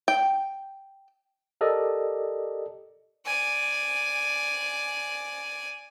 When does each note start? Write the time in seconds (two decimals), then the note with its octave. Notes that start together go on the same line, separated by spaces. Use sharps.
0.08 G5
1.61 G4 A4 A#4 D5 D#5
3.26 D5 G#5